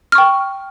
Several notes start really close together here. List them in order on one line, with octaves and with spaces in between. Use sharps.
F6 C#6 G5